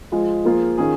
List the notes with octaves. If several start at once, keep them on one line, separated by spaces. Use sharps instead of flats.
F3 G#3 F4 G#4
F3 A#3 F4 G#4
D#3 C#4 F4 G#4